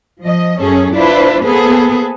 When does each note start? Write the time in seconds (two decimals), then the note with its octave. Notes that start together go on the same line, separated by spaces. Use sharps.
0.22 F3 D#5
0.60 F#2 C#4 G#4 A4
0.93 D4 E4 F4 B4 C5 E5
1.42 A#3 B3 G#4 A4 B4 C5